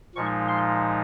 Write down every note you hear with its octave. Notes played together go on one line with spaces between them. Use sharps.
A#2 F3 G#3 D#4 C#6
C6